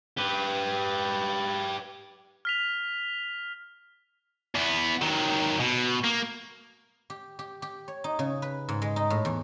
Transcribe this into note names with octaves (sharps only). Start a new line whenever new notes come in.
G4 B4
F6 B6 F7
E2 B3
D#3 F#3
B2
A#3
G4
G4
G4
C#5
D#4
C#3
B4
G#2
G#3
D#4
A2
E2